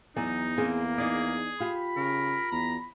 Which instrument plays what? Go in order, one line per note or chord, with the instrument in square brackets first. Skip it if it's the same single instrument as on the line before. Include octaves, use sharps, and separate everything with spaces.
[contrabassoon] E2 [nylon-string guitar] F#3 D5 G#5 [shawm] D#4
[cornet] A#3 [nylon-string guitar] C4 G#4
[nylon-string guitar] D#4 D5 [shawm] G#4
[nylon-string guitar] F4 G4 [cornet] B5
[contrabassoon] C#3 [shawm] A#4
[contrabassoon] E2 [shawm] A#5